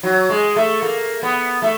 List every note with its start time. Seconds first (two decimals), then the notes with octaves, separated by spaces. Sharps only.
0.03 F#3
0.30 G#3
0.56 A3
0.82 A#3
1.23 B3
1.62 A3